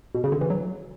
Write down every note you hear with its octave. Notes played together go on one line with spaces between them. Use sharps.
B2
C#3
D3
E3
F#3